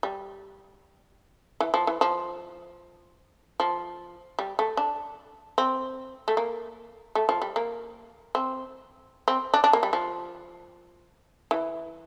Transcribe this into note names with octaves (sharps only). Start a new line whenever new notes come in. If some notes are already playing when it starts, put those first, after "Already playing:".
G3
E3
F3
E3
F3
F3
G3
A3
D4
C4
A3
A#3
A3
F3
G3
A#3
C4
C4
D4
D4
A#3
G3
F3
E3